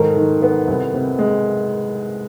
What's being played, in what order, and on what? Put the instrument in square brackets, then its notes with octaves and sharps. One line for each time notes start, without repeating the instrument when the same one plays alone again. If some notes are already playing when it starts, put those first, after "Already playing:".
Already playing: [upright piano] G#2 D#3 [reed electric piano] A4 A#4
[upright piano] D#3
B3
C2
C3
G#3